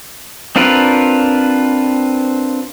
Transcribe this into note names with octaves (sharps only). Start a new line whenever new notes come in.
C4 D4 F4 A#4 B4